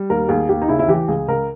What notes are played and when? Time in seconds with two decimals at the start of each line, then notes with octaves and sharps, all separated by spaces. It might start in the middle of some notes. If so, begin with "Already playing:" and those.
Already playing: G3
0.10 D#2 A#4
0.29 D#2 G#4
0.49 D#2 G4
0.62 D#4
0.69 C#3 E4
0.79 E4
0.88 E3 G4
1.08 C#2 G#4
1.28 C#2 A#4